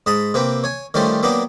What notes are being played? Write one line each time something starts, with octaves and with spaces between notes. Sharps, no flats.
G#2 D#5 A5 B5 D#6
C3 A#3 C4 B4 G5
C#5 G#5
D#3 G3 A3 C#4 F4 C5
F#3 A#3 B3 D4 G4